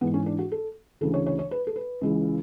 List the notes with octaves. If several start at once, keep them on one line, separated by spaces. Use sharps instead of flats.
G#2 E3 B3
C#4
D4
F#4
A4
D2 C#3 E3 A4
C#5
C#5
C#5
B4
A4
B4
C#2 C#3 E3